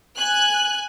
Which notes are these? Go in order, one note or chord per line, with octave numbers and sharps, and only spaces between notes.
G#5 F#6